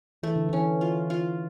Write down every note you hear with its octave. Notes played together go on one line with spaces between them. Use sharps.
E3 A3
D3
E3 C#4
F4
F4